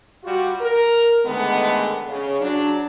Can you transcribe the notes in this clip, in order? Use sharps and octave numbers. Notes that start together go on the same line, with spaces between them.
G3 F4 F#4
A#4
D3 D#3 G#3 A3 B3
C#3
F#3 D4